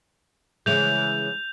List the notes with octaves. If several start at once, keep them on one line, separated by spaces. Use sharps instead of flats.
C#3 E3 G#3 G6 F7